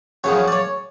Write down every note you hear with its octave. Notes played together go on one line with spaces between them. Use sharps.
F#2 C#3 F3 C#5
D5
C#5